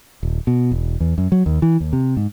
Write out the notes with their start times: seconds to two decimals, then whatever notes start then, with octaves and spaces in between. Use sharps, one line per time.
0.23 D#1
0.47 B2
0.72 E1
1.00 E2
1.18 F#2
1.32 F#3
1.46 D#2
1.62 E3
1.80 D#2
1.93 C3
2.17 G#2